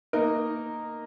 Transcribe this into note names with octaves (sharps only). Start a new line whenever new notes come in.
A#3 D#4 A#4